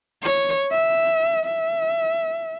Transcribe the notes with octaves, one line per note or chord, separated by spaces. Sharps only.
C#5
E5
E5